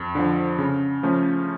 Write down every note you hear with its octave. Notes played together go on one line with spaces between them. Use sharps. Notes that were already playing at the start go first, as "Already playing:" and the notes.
Already playing: F2
D3 F3
C#3
F3 A3 C#4